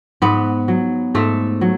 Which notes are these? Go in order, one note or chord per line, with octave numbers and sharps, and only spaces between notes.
G#2 B3
F#3
G#2 A3
F#3